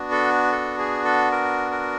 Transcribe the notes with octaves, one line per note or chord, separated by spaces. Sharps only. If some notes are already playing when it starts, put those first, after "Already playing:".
Already playing: B3 D4 F#4
A4
A4
G#4
A4
A#4
A#4